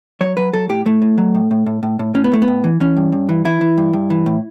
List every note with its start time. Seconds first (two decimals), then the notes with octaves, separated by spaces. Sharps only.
0.21 F#3 C#5
0.37 F#3 B4
0.53 F#3 A4
0.69 A2 G4
0.86 A2 A3
1.02 A2
1.18 F#3
1.35 A2
1.51 A2
1.66 A2
1.83 A2
1.99 A2
2.15 A2 C#4
2.24 B3
2.32 A2 A3
2.42 B3
2.48 A2
2.64 E3
2.80 E3 C#4
2.97 G2
3.12 G2
3.29 E3
3.45 E3 E4
3.61 E3
3.77 G2
3.93 G2
4.10 E3
4.26 A2